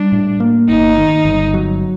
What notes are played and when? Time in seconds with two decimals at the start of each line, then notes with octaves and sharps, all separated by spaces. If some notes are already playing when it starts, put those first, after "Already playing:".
Already playing: G3 D4
0.12 A2
0.40 A#3
0.68 G1 D#4
0.97 D#3
1.25 G1
1.54 F#3